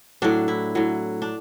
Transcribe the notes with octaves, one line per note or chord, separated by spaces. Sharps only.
A2 F#3 D4
E4
A2 F#3
D4